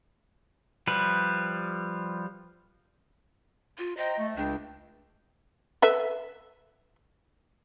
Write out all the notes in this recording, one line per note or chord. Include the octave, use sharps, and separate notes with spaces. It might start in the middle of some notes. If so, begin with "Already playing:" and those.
F3 G3 B4
F4
C5 D#5 G5 A#5
A3
C#2 C#3 D4 G5
A4 B4 E5